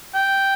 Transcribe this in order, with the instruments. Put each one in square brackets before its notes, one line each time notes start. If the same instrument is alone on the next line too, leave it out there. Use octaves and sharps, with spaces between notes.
[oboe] G5